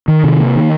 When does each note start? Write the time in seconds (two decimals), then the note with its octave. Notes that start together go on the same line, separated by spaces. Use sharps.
0.08 D#3
0.24 C3
0.40 A#3
0.56 D#3